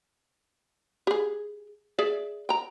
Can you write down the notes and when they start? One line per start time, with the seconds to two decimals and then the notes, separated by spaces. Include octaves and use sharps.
1.07 G4 G#4
1.99 G#4 D5 E5
2.49 G5 A#5